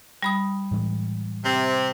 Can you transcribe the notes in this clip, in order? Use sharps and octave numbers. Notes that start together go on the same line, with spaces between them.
G3 B5 D#6
A2 E3 G#3
C3 C4